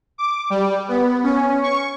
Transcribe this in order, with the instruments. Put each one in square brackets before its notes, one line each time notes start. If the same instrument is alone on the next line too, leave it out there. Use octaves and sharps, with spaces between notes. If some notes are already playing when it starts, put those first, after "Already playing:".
[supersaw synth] D6
G3
B3
C#4
C#6